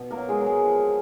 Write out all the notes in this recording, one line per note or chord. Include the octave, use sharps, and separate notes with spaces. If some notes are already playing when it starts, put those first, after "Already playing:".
Already playing: B2
A#3 A#4
F#3
G#3 G#4
F#3
G#3 G#4
F3